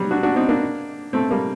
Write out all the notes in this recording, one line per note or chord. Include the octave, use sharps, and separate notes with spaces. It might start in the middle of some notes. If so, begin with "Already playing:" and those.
Already playing: F#3 G3
D4 F#4
D4 F#4
C4 D#4
A#3 D4
A3 C4
G3 A#3